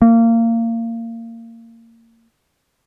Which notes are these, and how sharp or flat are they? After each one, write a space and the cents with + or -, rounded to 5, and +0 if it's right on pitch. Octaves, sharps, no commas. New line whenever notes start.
A#3 -25